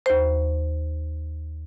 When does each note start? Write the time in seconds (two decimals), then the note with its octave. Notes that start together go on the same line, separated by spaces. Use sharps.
0.06 D#2 C5